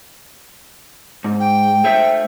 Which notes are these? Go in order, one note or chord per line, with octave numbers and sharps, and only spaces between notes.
G#2
G5
A3 C5 E5